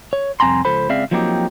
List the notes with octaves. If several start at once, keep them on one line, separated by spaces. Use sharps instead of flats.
C#5
C2 F2 C4 G#5 A#5 C6
C#2 F3 A4 C5 B5
C#2 C4 G#4 D5 E5 F5
F3 F#3 A#3 C4 D#4 G4